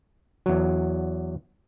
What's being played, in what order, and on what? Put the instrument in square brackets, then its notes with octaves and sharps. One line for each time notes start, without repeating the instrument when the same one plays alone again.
[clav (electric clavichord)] E2 F#3